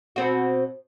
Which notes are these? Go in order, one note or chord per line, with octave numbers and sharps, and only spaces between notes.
B2 C4 F#4